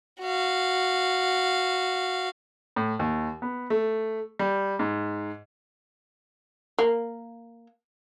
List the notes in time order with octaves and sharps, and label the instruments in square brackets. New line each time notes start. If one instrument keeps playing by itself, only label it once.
[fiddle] F#4 F5
[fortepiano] A2
D#2
B3
A3
G3
G#2
[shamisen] A#3